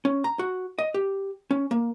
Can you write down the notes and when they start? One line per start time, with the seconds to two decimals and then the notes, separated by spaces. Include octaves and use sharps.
0.05 C#4
0.24 A#5
0.39 F#4
0.79 D#5
0.94 G4
1.51 C#4
1.71 A#3